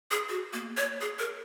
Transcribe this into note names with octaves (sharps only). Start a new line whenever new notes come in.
G#4
F#4
A#3
C#5
G#4
A#4